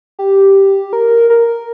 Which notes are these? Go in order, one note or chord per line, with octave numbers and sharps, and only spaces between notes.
G4
A#4
A#4